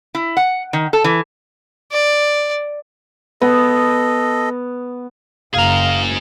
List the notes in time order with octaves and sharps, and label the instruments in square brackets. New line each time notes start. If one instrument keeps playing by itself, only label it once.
[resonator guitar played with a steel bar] E4
F#5
D#3
A4
E3
[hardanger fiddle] D5
[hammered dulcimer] B3 [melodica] A4 D#5
[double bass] F#1 [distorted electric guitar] G#4 A#5 [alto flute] F5